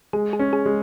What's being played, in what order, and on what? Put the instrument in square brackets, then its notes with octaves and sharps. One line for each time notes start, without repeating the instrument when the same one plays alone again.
[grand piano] G#3 [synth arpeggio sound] G#4
[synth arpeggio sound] G#4
[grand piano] C#4
[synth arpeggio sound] G#4
[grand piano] G#3